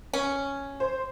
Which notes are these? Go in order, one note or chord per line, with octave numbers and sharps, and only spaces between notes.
C#4
C5